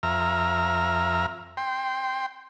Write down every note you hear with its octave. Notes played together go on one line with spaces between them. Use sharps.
F2 E5 A#5 F6
G5 C6